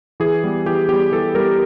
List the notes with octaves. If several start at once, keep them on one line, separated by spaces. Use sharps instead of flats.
E3 G#4
G3 B3
E3 G4
G3 B3 G4
E3 A4
G3 B3 A#4